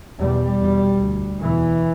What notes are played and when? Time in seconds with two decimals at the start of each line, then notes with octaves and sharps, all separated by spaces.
0.20 E2 B2 G3
0.61 E2 B2
1.02 D2
1.42 E2 B2 E3